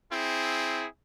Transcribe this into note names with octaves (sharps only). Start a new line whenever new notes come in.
C4 E4 G#4